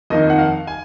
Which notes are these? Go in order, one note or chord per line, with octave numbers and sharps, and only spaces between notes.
F2 D#3 A#3 D#4 D#5
F#5
F5
G#5